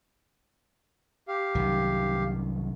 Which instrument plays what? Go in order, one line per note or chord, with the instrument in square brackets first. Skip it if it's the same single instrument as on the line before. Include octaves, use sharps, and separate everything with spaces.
[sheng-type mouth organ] G4 F5
[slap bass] C2 F#2 D#3